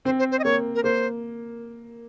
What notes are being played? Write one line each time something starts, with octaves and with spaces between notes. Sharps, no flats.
C4 C5
C5
C5
D#5
A#3 C#5
A#4
A#3 C5